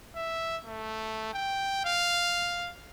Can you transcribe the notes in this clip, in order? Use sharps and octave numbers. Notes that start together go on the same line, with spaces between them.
E5
A3
G5
F5